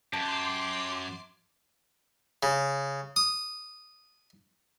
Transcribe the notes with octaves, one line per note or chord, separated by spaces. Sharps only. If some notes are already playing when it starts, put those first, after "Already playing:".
F#2 G4 A5 C6 D6 C7
C#3
D#6